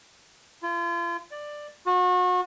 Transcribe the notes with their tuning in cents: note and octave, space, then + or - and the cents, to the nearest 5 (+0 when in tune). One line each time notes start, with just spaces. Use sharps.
F4 -35
D5 +10
F#4 -35